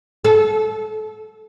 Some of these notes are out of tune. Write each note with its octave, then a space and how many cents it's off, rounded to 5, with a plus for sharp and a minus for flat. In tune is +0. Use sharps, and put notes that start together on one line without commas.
A4 -30